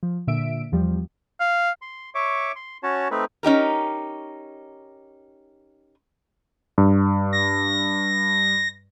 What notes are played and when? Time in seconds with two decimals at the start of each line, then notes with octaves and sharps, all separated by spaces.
0.03 F3
0.27 A#2 D3 E5 D7
0.72 E2 F3 G3
1.40 F5
1.82 C6
2.15 C#5 E5 C#6 D6
2.56 C6
2.83 C#4 F#4 C#5 A5
3.11 A3 C4 D#4 B4
3.43 C#4 D#4 G4 A#4
6.78 G2
7.33 A#6